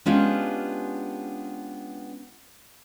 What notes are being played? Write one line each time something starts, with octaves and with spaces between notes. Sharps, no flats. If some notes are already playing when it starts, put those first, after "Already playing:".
G#3 B3 C#4 D4 F4 G4